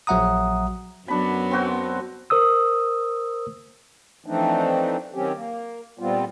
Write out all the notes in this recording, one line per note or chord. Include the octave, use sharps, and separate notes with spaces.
A#1 F#3 E5 F#5 A#5 D#6
F#2 F#3 B3 D4 B5
C4 F#4 C5
A#4 C5 D#6 E6
E3 F3 A3 C4 D4 D#4
D#3 F#3 C4 C#4 G4
A#3
A#2 G3 B3 C4 F4